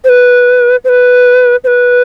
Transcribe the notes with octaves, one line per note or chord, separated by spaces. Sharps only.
C5
B4
C5
B4
C5
B4